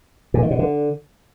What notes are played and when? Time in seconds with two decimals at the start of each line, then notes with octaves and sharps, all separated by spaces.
0.34 A#2
0.42 D#3
0.51 B2
0.59 D3